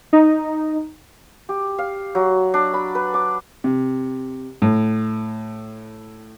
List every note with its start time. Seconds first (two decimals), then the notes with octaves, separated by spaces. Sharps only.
0.13 D#4
1.49 G4
1.78 F5
2.15 F#3
2.54 D4
2.74 B5
2.95 B4
3.14 D6
3.64 C3
4.62 A2